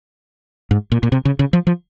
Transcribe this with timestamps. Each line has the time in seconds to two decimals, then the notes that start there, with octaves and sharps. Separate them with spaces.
0.71 G#2
0.92 A#2
1.03 A#2
1.12 C3
1.25 C#3
1.39 C#3
1.53 F3
1.67 F3